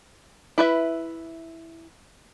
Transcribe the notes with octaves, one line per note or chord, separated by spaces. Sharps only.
E4 B4 E5